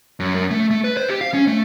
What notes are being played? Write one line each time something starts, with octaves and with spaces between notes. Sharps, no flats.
F#2
F#2
A3
A3
B4
C5
G4
F5
C#4
A3